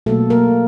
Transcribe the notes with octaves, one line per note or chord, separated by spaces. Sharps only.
B2 F#3 A3 A#3 A4
A#3 A#4